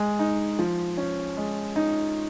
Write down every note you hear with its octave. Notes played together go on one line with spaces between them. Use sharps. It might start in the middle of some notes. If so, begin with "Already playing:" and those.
Already playing: G#3
D#4
F3
C#4
G#3
D#4